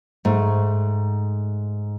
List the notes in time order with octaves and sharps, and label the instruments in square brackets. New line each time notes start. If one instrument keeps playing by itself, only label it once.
[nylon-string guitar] G#2 A3